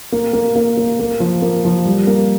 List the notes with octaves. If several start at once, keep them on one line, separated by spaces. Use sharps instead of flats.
A#3
A#3
A#3
A#3
A#3
F3
A#3
F3
G3
A#3